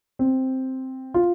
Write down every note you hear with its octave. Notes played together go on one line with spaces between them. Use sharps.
C4
F4